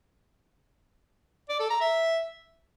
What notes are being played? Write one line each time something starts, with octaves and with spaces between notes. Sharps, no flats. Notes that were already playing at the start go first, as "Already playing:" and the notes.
D5
A4
A#5
E5